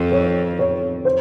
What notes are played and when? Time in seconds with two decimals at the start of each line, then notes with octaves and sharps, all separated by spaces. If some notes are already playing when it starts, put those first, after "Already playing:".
Already playing: F2
0.12 C#5
0.59 C#5
1.05 C5